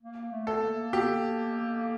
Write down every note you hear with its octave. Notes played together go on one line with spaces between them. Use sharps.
A#3
A3
A4
A#3
G4